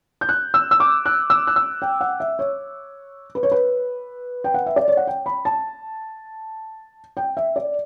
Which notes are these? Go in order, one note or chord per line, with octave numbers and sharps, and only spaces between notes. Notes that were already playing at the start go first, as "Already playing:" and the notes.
G6
F#6
E6
E6
D6
F#6
E6
F#6
E6
G5
F#5
E5
C#5
B4
C#5
B4
G5
F#5
E5
D5
C#5
F#5
G5
B5
A5
G5
E5
D5